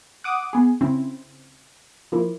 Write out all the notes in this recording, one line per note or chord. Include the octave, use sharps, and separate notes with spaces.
F#5 D6 D#6
B3 G#4
C#3 C4 E4
F3 A#3 E4